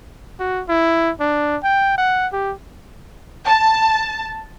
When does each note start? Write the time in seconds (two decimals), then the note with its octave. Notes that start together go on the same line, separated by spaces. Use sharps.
0.39 F#4
0.69 E4
1.20 D4
1.64 G5
1.98 F#5
2.33 G4
3.46 A5